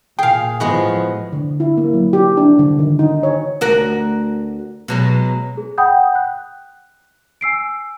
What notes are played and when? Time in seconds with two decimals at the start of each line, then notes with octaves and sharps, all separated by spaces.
0.19 A#2 G#4 F5 G5
0.60 A2 F3 G#3 B3 F#4
1.33 D3
1.60 E4
1.77 A#3
1.94 F#3
2.13 G4
2.37 D4
2.59 D3
2.79 D#3
2.99 D#4
3.23 C#5
3.61 D2 F#4 A#4
4.88 B2 F#3 G#3
5.57 G#4
5.78 F#5 G5 B5 D#6 G6
6.15 F#6
7.41 G#5 E6 C7 D7